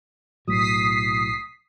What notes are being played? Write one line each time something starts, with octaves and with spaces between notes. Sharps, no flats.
B1 A2 F#3 D#6 B6 C7